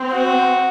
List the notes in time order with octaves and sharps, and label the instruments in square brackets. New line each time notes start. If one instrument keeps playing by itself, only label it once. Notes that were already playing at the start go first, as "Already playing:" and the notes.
Already playing: [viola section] C4
[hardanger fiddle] F#4